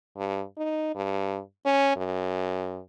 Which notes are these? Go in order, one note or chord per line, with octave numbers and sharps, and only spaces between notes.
G2
D#4
G2
C#4
F#2